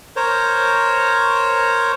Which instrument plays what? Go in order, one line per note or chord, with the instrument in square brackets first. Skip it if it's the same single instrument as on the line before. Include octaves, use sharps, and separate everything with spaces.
[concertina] A#4 C5 C#5